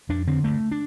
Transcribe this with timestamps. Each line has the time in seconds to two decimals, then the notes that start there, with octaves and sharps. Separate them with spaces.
0.09 F2 D4
0.27 D3 C4
0.44 G2 A3
0.71 D4